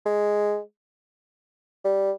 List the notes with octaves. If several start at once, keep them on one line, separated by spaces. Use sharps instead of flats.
G#3
G3